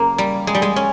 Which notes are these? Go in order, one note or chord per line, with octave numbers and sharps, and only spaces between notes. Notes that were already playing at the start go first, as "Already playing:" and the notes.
Already playing: F#2 C#3 A#3
G3
G#3
G3
G#3
C#4